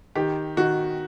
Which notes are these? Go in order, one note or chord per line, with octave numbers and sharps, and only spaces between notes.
D#3 G4
D#3 F#4